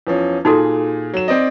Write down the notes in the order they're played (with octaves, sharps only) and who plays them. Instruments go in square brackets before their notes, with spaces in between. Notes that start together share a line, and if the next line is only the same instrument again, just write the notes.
[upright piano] E2 F3 C#4
[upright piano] A#2 G#4 [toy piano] D#4 F#4 A4
[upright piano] F#3 E7
C4 D5 D#5